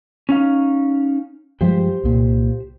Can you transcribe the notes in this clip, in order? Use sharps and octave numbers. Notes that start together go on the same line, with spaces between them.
C#4 D#4 F5
G2 F3 G#3 G4 C5
C2 A#2